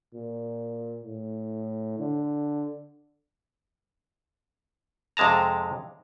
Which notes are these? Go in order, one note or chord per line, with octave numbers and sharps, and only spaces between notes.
A#2
A2
D3
F2 C3 G#3 A5 A#5